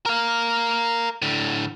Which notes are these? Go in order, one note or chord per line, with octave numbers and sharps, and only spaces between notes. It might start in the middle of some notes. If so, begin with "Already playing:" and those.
A#4 F5
A2 D3